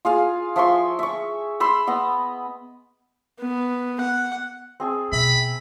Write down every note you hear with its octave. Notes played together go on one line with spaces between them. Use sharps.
F4 G#4 F5
F3 E5 C6 C#6
E5 C#6
B5 C6 E6
B3 D#5
B3
F#5
C4 G#4 A5
B2 E5 B5